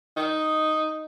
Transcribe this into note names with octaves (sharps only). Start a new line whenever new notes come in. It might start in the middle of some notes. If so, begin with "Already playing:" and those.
D#4